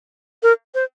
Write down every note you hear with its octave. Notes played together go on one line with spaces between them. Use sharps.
A#4
C5